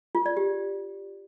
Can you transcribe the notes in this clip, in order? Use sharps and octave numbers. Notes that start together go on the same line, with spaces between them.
F4
D5
G4